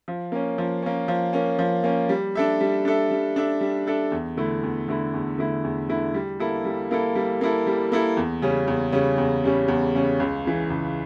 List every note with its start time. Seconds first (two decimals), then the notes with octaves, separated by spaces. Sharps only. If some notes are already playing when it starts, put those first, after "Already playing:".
0.08 F3
0.32 A#3 C#4
0.58 F3
0.83 A#3 C#4
1.08 F3
1.33 A#3 C#4
1.59 F3
1.84 A#3 C#4
2.09 G3
2.35 D4 A4 E5
2.61 G3
2.85 D4 A4 E5
3.11 G3
3.36 D4 A4 E5
3.61 G3
3.87 D4 A4 E5
4.12 E2
4.37 D3 A3 E4
4.63 E2
4.88 D3 A3 E4
5.14 E2
5.38 D3 A3 E4
5.64 E2
5.89 D3 A3 E4
6.14 G3
6.40 A#3 E4 A4
6.65 G3
6.91 A#3 E4 A4
7.15 G3
7.41 A#3 E4 A4
7.67 G3
7.92 A#3 E4 A4
8.17 E2
8.42 C#3 G3 C#4
8.68 E2
8.92 C#3 G3 C#4
9.18 E2
9.44 C#3 G3 C#4
9.68 E2
9.94 C#3 G3 C#4
10.20 C#2
10.45 C#3 E3
10.70 C#2